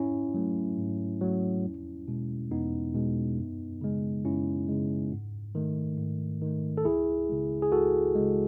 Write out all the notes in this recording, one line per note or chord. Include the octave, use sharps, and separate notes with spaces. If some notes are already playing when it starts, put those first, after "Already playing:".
Already playing: G#2 C#4 E4
F#3 A3
G#2
F#3 A3
E2
B2 G#3
E2 B3 D#4
B2 G#3
F#2
C#3 G#3
F#2 C#4 E4
C#3 G#3
G#2
D#3 A3
G#2
D#3 A3
A4
C#2 E4 G#4
C#3 G#3
G#4
C#2 F#4 A4
C#3 G#3